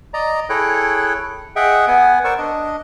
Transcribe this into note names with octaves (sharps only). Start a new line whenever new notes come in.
D5 D#5 A#5
E4 G#4 A4 C#5 G5 F#6
G#4 D#5 E5 F#5 G5
B3 F#5 G#5
A#4 C5 D5 F#5 C#6 E6
D4 D#5